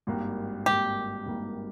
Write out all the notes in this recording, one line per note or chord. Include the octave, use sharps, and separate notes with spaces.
G#1 G2 G3 A#3
G#1 G2 G3 A#3 G4
G#1 G2 G3 A#3